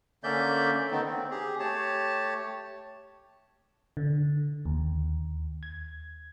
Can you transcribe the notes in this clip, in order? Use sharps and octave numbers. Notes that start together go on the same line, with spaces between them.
D3 A#3 C#4 D5 E5 G6
D3 D#3 A3 B3 C4 D#4
C4
G4 G#4
A3 G4 C#5 A5
D3
D#2
G#6